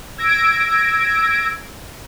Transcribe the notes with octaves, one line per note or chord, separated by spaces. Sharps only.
E6 G#6 A#6 D7